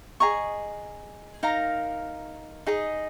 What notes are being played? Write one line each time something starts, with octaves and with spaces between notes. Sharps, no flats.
G#4 D#5 A#5 C#6
D#4 A#4 F5 A#5
D#4 G#4 D#5